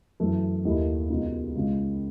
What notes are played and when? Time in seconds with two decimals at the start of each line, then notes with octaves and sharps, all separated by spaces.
0.20 F#2 E3 A3
0.65 D#2 D#3 A3 E4
1.10 C#2 B2 G#3 D#4
1.55 C#2 C#3 G#3